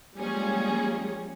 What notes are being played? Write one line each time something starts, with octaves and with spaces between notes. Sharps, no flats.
F3 G3 G#3 A#3 C#4 G#4